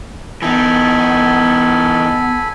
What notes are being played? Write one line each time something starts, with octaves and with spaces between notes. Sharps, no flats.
E3 B3 D#4 A4 G#5 B5